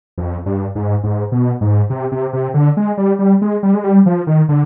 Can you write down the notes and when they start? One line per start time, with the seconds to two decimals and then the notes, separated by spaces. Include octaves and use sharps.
0.18 F2
0.46 G2
0.75 G#2
1.04 G#2
1.32 B2
1.61 G#2
1.90 C3
2.12 C3
2.33 C3
2.54 D3
2.77 G#3
2.97 G3
3.19 G3
3.42 G#3
3.63 G3
3.74 G#3
3.84 G3
4.06 F3
4.27 D#3
4.49 D3